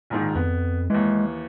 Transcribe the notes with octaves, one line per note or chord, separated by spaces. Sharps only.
A#1 G#2 D#3
F2 B3
D#2 E3 G#3